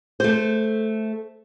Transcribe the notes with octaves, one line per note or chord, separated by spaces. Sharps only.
A3 C5